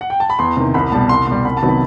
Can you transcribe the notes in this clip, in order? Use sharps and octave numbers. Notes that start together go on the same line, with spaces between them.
F#5
G5
A5
B5
E2 C6
C3 D#3
C2 B5
B2 G3 A5
C2 C6
B2 G3 C6
C2 B5
A5
C3 D#3 F#3 B3
B5